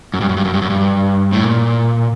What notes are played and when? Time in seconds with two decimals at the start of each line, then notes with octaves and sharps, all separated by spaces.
0.14 F#2
0.21 G2
0.29 F#2
0.37 G2
0.45 F#2
0.54 G2
0.62 F#2
0.70 G2
1.33 A2
1.43 A#2